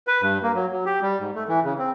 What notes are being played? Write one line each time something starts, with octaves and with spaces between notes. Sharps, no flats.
B4
G2
A#3
F#3
F#3
G4
G3
G#2
A3
E3
C#3
C4